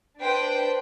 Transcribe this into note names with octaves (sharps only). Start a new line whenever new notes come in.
D4 B4 C5 G5